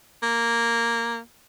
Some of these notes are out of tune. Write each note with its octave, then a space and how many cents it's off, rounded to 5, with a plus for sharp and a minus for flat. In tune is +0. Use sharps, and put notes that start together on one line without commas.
A#3 -5